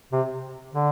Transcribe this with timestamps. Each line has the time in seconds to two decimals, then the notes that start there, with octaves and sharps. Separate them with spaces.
0.12 C3
0.72 D3